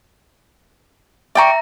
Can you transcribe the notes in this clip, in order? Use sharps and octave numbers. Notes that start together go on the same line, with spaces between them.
D5 E5 G5 A#5 C#6